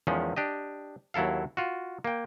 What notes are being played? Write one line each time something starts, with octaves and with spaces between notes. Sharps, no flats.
E2 D#3 F3 G#3 C#4
D4 G4 D#5
D#2 F#3 E4 A4 F5
F4 F#4
A#3 G5